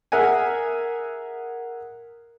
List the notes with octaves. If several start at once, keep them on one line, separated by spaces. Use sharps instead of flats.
G#4 A#4 E5 F#5 G#5